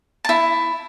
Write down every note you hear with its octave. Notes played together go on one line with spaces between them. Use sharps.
E4 A5